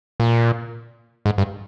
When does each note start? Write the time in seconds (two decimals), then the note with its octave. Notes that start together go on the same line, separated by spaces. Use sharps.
0.20 A#2
1.26 G#2
1.38 G2